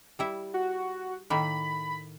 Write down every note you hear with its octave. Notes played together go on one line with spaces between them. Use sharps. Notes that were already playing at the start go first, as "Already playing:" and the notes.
G3 E4 E5
F#4
A2 D#3 A#3 B5